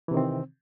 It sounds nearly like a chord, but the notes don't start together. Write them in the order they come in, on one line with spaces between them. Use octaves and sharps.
E3 C3 D#3 C4